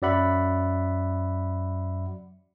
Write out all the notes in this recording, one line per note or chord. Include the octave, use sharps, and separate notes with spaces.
F#2 F#3 D5 E5 F#5 B5